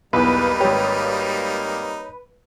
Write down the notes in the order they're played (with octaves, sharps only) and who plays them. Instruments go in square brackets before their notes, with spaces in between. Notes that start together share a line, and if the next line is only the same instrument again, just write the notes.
[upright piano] B1 E2 [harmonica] G3 A#3 D#4 [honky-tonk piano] B4
[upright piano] G#1 G4 [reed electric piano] C#5